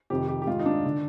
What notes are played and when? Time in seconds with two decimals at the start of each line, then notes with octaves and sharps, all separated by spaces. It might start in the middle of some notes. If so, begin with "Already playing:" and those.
0.10 F2 C3 D#3 G4
0.28 G4
0.42 G4
0.47 G#2 D#3 F4
0.59 D#4
0.66 D4
0.86 D3